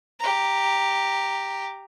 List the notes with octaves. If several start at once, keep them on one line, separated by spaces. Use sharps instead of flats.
G4 A#5